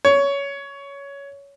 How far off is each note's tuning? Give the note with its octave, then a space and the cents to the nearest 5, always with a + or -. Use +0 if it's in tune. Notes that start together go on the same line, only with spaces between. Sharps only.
C#5 +15